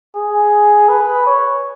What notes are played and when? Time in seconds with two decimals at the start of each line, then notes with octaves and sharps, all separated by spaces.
0.15 G#4
0.89 B4
1.27 C#5